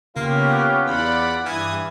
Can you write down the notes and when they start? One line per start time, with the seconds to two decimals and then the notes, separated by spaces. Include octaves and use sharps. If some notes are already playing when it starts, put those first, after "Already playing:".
0.16 C#3 A#3 B3 C#4 F4 G4
0.51 D6 F6 F#6
0.87 E2 D5 F#5 B5
1.46 G2 E3 D#6 G#6